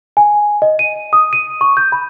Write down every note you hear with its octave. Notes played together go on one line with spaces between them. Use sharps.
G#5
D#5
D#7
D#6
D#7
C#6
G6
B5